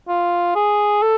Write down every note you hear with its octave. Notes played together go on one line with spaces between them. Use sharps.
F4
G#4
A4